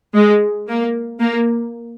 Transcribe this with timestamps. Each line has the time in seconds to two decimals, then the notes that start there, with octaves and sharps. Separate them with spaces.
0.15 G#3
0.68 A#3
1.20 A#3